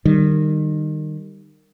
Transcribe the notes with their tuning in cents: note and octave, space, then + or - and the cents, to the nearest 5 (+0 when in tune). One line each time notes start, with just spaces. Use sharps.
D#3 -25 G3 +0